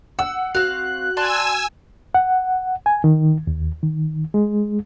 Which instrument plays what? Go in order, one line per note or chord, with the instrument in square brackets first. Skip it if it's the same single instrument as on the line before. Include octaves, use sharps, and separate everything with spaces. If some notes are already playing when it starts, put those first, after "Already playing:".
[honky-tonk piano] F#5 [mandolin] E6
[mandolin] C4 F5 [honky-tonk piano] F#4 [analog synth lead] F#6
[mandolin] D5 A5 C6 [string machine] G#5 E6
[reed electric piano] F#5
G#5
D#3
D#2
D#3
G#3